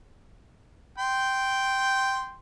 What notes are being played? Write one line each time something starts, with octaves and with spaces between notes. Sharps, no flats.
G5 C6